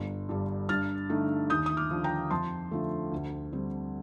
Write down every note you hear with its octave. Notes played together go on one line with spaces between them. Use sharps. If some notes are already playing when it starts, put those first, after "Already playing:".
Already playing: G1
G2 D3 G3
G2 F6 A6
D3 A3 D#4
D#2 D#6 G6
D#6
D6 F6
D3 F3
G5 A#5
F2 A5 C6
D3 F3 A3
D2
D3 G3 C4